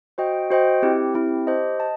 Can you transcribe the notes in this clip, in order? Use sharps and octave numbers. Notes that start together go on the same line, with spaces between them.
F#4 C5 D#5 G5
F#4 C5 D#5 G5
C4 E4 G4
C4 E4 G4
G4 C5 D#5 A5
D#5 A5